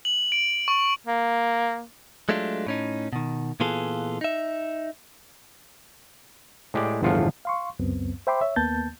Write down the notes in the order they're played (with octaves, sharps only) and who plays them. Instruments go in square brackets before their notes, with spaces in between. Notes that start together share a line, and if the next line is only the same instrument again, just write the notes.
[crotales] F#7
D7
C#6
[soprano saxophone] A#3
[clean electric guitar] F#3 G#3 A3 D4 F4
A2 C#4 D#4
B2 D#3
A#2 E3 B3 F4 G#4 A4
D#4 E5
[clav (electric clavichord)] A2 G#3 G4 D5
G1 E2 A2 F3 F4 F#5
[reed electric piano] F5 C6 C#6
C#2 F#2 B3 C4
C5 E5 G5 B5 C6 D6
C#5 E5
D#2 A#3 B3 A5 G6 A6